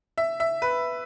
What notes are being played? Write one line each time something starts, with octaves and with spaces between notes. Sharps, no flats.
E5
E5
B4